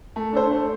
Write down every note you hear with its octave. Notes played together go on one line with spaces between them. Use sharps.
A3
D4 A4 C5
A3